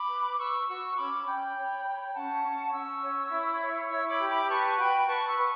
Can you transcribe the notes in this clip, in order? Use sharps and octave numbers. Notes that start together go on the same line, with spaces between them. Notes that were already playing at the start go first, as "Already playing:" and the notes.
Already playing: B5 D6
B4
B4 C#6 E6
F#4 C#6 E6
C#4 B5 D6
C#4 G5 B5
C#5
C#5
C#4 F#5 A5
C#4
C#4 C#6 E6
C#5
E4
C#5
E4 C#6 E6
B5 D6
G4
B5 D6
B4 A5 C#6
F#4 G5 B5
B4 A5 C#6
C#6 E6
B4